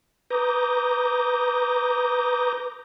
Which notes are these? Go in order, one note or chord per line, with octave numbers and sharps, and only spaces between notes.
B4 A#5 D6 D#6 G6 A#6